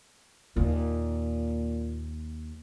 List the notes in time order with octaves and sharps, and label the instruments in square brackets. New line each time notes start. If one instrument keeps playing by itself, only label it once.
[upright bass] D#2 [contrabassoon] A#2